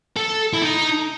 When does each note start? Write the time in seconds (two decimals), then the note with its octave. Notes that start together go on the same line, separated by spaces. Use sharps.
0.17 A4
0.53 E4
0.62 D#4